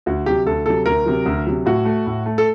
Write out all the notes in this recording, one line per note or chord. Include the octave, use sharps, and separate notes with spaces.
D2 F#4
C3 F#3 G4
D2 A4
C3 F#3 A4
D2 A#4
C3 F#3
D2
C3 F#3
A2 F#4
A3
A2
A3
A4